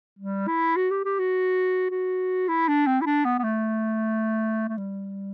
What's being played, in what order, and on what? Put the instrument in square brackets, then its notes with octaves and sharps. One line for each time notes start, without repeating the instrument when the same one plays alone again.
[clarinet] G3
E4
F#4
G4
G4
F#4
F#4
E4
D4
C4
E4
D4
B3
B3
A3
A3
G3